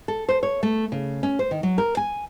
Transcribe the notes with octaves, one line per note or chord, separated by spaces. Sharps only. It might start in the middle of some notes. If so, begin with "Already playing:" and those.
A4
C5
C#5
A3
C#3
C#4
C5
D#3
F#3
A#4
G#5